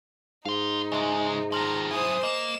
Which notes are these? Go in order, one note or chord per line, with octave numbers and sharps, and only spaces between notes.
G#2 D#4 F5 C6
C#3 G#3 D#5 E5 C6
D#3 F3 A#5 C6 F6 A#6
F#2 E4 C5 G#5 D#6
A#3 D#5 E7